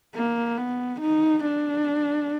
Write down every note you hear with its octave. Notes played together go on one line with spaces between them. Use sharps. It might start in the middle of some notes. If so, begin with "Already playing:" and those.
A#3
B3
D#4
D4